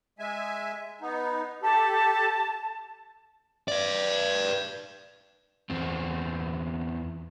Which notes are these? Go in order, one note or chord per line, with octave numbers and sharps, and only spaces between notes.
G#3 E5 G#5
B3 D#4
G4 A4 A5
B4 D5
E2 C4